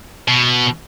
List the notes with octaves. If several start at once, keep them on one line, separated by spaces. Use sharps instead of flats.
B2